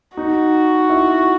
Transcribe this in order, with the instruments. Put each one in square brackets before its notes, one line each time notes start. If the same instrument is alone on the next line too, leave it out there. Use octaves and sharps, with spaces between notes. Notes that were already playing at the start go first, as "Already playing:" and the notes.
[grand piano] D#4 [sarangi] F#4
[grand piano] E4